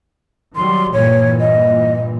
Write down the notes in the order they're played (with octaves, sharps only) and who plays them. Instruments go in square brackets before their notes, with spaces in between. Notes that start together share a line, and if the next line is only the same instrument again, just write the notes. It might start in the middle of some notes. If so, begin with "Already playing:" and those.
[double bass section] D#3 F#3 G3 [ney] C6
[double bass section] G2 A#2 E3 [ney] C#5
[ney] D#5